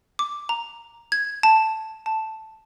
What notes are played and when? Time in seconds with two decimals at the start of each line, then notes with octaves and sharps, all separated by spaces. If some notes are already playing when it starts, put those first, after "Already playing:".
0.19 D6
0.49 A#5
1.12 G#6
1.43 A5
2.06 A5